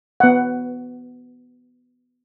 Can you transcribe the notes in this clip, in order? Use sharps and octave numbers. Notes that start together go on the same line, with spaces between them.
B3 F#5